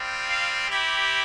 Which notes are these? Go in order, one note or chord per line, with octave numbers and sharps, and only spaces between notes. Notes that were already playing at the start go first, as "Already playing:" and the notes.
Already playing: G3 C4 F4
F5
C4 E4 G4